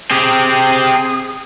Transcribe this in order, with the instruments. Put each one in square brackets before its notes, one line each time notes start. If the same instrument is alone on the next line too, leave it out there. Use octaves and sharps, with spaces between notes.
[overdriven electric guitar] C4 G4 [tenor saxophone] G#4